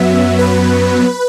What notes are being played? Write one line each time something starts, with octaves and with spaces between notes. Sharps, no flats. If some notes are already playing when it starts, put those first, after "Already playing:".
Already playing: F#2 F#3 B3 E5
B4